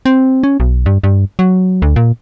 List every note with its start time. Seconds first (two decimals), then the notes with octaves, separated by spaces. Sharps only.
0.06 C4
0.43 C#4
0.60 B1
0.86 G2
1.04 G2
1.39 F#3
1.82 D2
1.96 A#2